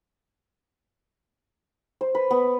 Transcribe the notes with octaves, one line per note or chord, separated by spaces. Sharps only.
C5
B4
B3